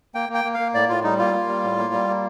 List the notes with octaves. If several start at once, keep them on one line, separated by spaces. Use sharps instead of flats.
A#3 G5
A#3
G5
A#3
F5
A#3
A2 D5
A2 F4
G3 D#4
A#3 F4
A#3
G3
A2
A#3
G3
A#3